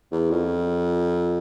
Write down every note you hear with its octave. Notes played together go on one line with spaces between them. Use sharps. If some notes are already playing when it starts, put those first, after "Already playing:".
E2
F2